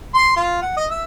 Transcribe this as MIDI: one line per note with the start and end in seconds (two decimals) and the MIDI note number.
0.15 0.32 84
0.37 0.62 65
0.62 0.76 78
0.77 0.86 75
0.90 1.03 76